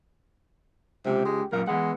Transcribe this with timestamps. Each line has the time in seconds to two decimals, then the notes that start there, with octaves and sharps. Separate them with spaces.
1.05 C#2 C3 G4
1.25 G#3
1.52 F#2 A#2 A#4 F5
1.67 E3 G#3 B3 F#5